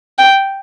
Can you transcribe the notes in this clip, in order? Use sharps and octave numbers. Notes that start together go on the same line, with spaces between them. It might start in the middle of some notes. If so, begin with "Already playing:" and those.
G5